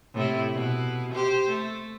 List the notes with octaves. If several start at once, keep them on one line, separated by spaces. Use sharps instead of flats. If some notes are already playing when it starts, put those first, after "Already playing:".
A2 C3 E4
B2 E4
G4 C5
A3